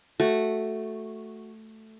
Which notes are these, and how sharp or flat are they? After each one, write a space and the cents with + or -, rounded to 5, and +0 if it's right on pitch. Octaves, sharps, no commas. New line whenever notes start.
A3 +0 F#4 +0